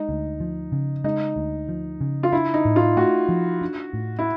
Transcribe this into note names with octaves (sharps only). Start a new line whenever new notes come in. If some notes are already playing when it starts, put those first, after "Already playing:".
Already playing: G#3 D#4
D2
F3
C#3
G#3 D#4
D2
F3
C#3
F4
D4 E4
D#4
A2
F4
A3 F#4
F3
D4
A2
E4